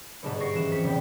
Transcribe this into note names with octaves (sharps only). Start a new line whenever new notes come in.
G1 G#2 B2 G3 A5 F#6
C#6 A#6 C7 D7
E3 C#4 F#6 E7
F2 B6 C#7 D7
F1 C#3 G3 B3 G5